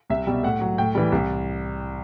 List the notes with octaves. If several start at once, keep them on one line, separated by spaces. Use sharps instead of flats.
C2 E5
B2 G3
A2 F#5
F#3
A2 G5
E3 G3
C2